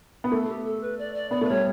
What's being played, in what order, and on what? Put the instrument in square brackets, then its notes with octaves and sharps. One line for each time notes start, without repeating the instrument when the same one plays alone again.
[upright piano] B3
[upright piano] A3 [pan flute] A4
[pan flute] G4
A4
B4
D5
D5
[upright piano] B3 [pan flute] D5
[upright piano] A3 [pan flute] B4
[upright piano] G3 [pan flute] C#5